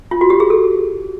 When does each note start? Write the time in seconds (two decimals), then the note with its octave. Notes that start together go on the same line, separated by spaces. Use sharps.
0.11 F4
0.21 F#4
0.30 G4
0.40 G#4
0.50 A4